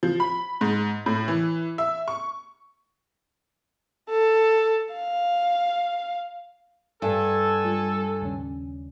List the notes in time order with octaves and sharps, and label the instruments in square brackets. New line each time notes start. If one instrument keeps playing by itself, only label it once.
[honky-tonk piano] F3
B5
G#2
A2
E3
E5
C#6
[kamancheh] A4
F5
[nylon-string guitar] G2 [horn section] A4 [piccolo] G#5
[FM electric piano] G3 F4
D#2 C#3 C#4